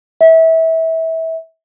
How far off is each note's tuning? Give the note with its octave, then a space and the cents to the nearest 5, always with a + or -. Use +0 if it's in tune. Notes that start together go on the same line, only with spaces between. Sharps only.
E5 -25